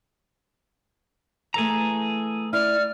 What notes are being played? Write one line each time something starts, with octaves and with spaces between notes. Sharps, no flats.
E3 A3 G#4 A4 A#5
E4 D5 F6